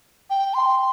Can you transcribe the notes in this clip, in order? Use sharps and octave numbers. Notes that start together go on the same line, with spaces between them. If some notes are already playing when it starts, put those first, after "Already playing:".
G5
C6